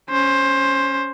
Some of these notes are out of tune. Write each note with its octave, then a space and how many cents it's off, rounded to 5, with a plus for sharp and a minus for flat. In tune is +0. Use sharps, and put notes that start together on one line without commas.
C#4 +0 C5 +15